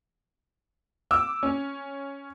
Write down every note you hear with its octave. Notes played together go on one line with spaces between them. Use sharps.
D6 E6
C#4